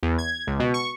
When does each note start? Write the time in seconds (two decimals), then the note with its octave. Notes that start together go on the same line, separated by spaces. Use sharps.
0.03 E2
0.18 G#6
0.47 C#2
0.60 B2
0.74 C#6